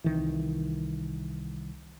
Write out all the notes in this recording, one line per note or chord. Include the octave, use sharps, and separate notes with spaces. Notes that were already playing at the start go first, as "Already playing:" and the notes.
C2 D#3 E3